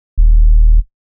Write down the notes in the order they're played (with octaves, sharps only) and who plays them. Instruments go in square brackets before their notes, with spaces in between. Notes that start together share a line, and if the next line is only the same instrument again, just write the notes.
[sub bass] D#1